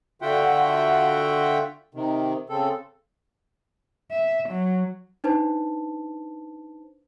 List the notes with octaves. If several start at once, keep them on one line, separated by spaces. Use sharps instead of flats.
D3 F4 F#4 E5 F#5 G5
C3 D#3
C#3 C4 A4
E5
F#3
D4 D#4 B4 C5 A5